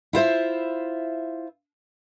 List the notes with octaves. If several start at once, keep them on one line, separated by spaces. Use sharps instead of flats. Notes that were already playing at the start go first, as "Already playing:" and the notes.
E4 F4 C5 E5